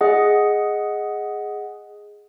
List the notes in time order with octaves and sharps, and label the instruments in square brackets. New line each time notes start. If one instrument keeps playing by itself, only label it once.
[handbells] G#4 D#5 F#5